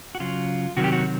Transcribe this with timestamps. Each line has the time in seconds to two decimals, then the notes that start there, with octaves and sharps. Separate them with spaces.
0.15 F#4
0.20 C#3 F#3 F4
0.77 C3 D#3 F#3 F#4
0.84 G4
0.92 F#4